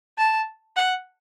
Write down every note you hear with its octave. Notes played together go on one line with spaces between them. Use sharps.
A5
F#5